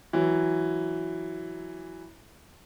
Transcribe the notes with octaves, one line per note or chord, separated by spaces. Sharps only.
E3 F#3